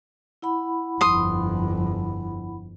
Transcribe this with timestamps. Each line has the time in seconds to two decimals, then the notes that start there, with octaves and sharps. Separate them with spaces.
0.42 E4 F#5 B5
1.01 G1 F2 C6 D#6